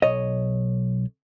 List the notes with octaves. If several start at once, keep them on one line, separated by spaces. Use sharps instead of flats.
B1 C#5 D#5